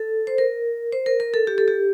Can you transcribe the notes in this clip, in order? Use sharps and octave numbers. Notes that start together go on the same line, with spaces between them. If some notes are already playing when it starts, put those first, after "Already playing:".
Already playing: A4
C5
A#4
C5
A#4
A#4
A4
G4
A4
G4